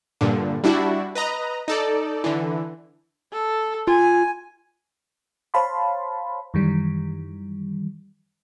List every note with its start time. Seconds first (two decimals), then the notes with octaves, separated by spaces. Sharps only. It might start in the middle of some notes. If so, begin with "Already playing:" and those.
0.21 G2 A#2 D3
0.64 G3 D4 E4 F#4
1.15 B4 D#5 A#5
1.68 D#4 A4 D5
2.24 D3 E3
3.33 A4
3.87 F4 G#5
5.54 C5 C#5 F5 A5 B5 C6
6.54 F#2 D#3 E3 G3